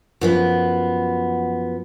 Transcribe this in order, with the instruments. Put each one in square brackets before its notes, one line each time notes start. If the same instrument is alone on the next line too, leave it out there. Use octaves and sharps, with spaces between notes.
[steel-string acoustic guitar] F#2 F3 B3